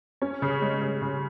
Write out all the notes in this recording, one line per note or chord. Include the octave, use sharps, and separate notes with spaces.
C#4
C#3
G#3
C#3
C#3